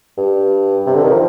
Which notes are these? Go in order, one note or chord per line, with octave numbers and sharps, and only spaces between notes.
G2
C3
D3
D#3
F3